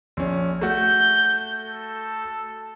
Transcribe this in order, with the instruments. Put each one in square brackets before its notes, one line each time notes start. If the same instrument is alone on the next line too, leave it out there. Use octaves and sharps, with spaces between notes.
[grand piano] A#1 C#4
[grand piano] A3 F#4 [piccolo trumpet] G6
[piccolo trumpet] A4